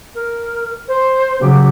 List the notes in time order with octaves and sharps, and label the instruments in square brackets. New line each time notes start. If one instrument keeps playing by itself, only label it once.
[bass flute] A#4
C5
[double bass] C#3 F#3 [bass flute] G4